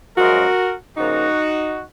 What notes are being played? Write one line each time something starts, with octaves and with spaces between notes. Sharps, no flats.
F#2 F3 G#3 C#4 F#4 A#4
C#3 F3 A#3 D#4 F#4